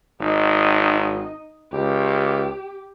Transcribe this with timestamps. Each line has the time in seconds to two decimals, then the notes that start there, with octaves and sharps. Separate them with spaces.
0.20 G#1 D#4 D#5
1.72 C#2 G4